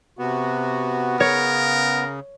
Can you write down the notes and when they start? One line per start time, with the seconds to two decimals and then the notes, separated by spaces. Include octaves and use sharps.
0.19 C3 B3 F#4
1.20 C#3 A#4 C#5